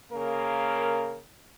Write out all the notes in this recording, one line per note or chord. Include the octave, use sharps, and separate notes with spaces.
C#3 A#3 A#4